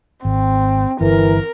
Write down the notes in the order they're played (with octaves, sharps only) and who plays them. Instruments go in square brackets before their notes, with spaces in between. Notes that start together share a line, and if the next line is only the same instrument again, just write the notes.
[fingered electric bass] G#1 [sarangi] C4
[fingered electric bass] G1 [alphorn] E3 [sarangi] A#4